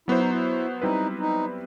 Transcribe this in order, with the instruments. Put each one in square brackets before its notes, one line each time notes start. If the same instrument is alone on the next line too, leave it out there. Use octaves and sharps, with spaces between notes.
[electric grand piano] F#3 B3 F#4 C5 [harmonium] E4
[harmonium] D#4
E4
[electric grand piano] G3 C4 E4 B4 [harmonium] D#4
[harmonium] D#4